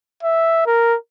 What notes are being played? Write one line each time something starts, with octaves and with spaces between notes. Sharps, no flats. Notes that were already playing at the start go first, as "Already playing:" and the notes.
E5
A#4